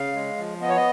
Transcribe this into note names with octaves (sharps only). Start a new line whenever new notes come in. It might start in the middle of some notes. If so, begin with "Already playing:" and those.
Already playing: C#3 F5
G#3
F3
B3 D#5
C#5
D#5